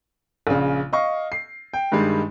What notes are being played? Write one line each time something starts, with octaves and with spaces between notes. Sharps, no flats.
A#1 C#3
D#5 F5 C#6
C7
G5
G2 D#3 G3 G#3